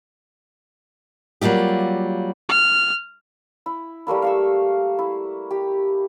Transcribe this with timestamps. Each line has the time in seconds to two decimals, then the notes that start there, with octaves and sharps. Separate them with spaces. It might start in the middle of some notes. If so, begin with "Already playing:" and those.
1.41 F#3 G3 A#3 F4 G4
2.49 F6
3.66 E4
4.07 G3 A3 A#3 E4
4.22 F5 C#6 E6
4.99 E4
5.51 G4